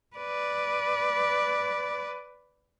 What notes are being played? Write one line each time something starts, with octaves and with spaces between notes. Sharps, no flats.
B4 D5